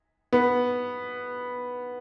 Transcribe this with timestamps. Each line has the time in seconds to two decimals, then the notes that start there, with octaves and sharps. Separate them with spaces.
0.33 B3